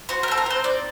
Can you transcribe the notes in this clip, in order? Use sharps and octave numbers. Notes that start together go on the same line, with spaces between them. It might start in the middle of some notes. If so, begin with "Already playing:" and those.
F#4 C5
A#4
C4 A4
A#4
C4 C5
D#4 D5